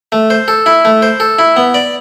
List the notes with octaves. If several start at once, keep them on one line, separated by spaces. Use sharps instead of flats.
A3
C5
A4
E4
A3
C5
A4
E4
B3
D5